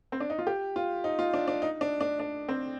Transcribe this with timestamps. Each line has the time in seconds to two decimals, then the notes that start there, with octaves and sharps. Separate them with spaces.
0.12 C4
0.20 D4
0.30 D#4
0.39 F4
0.47 G4
0.76 F4
1.04 D#4
1.19 F4
1.34 D4
1.48 D4
1.62 D#4
1.81 D4
2.01 D4
2.20 D4
2.49 C4